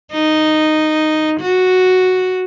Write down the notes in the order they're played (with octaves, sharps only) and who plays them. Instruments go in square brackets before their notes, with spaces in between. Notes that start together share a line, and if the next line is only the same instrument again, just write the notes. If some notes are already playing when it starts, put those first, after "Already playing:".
[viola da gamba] D#4
F#4